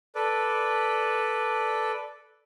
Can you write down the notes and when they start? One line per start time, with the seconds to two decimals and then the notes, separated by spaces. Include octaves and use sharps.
0.15 A4 B4 D5